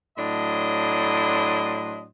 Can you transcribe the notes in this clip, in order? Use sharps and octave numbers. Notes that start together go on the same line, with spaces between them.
A2 F#3 D4 D#5 C6